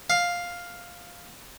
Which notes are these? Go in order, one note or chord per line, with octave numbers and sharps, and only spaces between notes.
F5